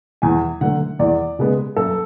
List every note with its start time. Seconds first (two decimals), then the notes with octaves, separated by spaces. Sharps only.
0.22 E2 G#5
0.61 D3 F#3 A3 F#5
0.99 E2 D5
1.39 C#3 G#3 B3
1.76 F#2 A4